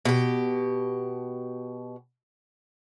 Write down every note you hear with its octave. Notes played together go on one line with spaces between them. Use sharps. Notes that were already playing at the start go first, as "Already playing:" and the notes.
B2 G4